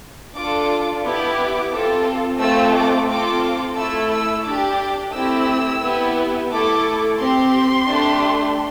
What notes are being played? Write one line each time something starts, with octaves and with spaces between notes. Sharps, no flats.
D4 F4 A4 D6
B3 E4 G4 D6
C4 F4 A4
A3 C4 F4 A4 E6
D6
C4 F4 A4 D6
A3 E4 A4 E6
E6
D4 G4 D6
A3 C4 E4 G4 E6
B3 E4 G4
A3 E4 A4 D6
C4 G4 C6
A3 D4 G4